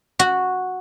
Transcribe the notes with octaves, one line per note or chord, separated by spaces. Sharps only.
F#4